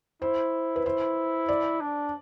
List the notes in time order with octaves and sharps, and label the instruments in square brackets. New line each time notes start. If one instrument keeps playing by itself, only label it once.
[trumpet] E4 [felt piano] C5
[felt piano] B4
[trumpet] E4 [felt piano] C5
[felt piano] D5
[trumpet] D4